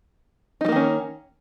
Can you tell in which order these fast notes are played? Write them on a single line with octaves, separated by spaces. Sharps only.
D#4 G3 A#3 D#3 C#4